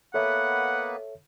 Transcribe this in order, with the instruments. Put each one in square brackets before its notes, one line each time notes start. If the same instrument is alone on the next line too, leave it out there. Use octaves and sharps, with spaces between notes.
[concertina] A#3 B3 B4 [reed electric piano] A4 C#5 E5 [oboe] F#5